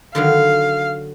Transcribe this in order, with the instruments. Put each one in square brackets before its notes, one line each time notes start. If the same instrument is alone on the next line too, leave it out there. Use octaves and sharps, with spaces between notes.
[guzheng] D3 D#3 F#3 [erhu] F5